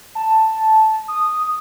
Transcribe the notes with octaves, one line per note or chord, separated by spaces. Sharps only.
A5
D#6